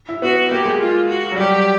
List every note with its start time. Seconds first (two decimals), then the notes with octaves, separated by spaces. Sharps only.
0.09 E4
0.22 B3 F#4
0.51 A#3 G4
0.66 G#3
0.79 F4
1.08 F#4
1.31 F#3
1.36 G3 G4